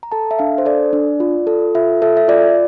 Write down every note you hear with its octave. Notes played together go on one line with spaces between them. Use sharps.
A#5
A4 A5
E5
D4 F5
C5
A4 D5
D4
F4
A4
F4 E5
A4 E5
E5
F4 D5